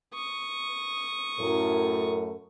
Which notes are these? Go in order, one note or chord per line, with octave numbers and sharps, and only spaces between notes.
C#6 D#6
F#2 A2 A#4